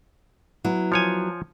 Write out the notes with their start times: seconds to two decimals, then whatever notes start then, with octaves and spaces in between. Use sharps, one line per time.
0.64 F#3 B3 E4
0.92 F3 C#5 G#5